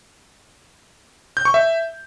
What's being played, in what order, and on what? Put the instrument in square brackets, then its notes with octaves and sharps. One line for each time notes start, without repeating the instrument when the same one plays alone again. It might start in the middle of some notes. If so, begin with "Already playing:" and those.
[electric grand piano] G6
C#6
E5